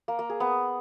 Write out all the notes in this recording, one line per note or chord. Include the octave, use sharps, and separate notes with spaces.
A#3
A#3
G#4
B3